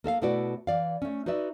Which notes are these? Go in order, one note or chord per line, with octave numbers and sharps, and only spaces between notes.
A#3 A4 E5 F5
B2 A3 E4 F#4 B4 D5
E3 D5 F5
A3 C#4
D#4 F#4 B4 D5 E5